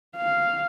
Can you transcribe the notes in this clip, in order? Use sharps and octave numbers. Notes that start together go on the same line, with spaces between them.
F5